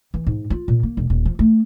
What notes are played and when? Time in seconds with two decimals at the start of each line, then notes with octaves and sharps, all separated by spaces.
0.14 E3
0.27 G#2
0.50 F4
0.68 A#2
0.83 A#3
0.97 E1
1.10 D#1
1.25 F3
1.39 A3